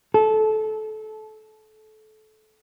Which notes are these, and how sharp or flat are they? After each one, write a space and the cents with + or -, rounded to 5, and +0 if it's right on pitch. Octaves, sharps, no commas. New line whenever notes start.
A4 -25